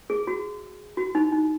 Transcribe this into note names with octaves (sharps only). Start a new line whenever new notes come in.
G#4
F#4
F#4
D#4
D#4